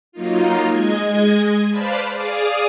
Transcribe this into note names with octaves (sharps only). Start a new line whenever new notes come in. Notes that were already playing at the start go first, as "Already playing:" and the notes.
F#3 A#3 D#4 F4
G#3 D#5 G#6
B4 C5 D5 F5 A5 B5
G#4 D5 F5 D#6